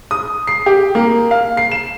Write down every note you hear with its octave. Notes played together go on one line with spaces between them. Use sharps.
D#6
C7
G4
A#3
F5
C7
E7